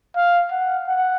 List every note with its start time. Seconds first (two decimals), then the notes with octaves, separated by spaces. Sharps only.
0.16 F5
0.52 F#5
0.88 F#5